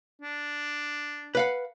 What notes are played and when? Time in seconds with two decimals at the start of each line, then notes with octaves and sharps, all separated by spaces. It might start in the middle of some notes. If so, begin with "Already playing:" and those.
0.22 D4
1.35 B4 F5 F#5